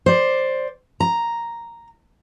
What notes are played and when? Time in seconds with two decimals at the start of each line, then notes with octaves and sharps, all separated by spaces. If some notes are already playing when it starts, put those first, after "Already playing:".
0.06 C5 D5
1.00 A#5